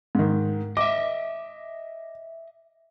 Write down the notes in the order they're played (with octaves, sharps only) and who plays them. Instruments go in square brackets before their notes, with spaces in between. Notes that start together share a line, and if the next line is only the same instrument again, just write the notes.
[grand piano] G#2 D#3
[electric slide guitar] D#5 E5 [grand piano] D6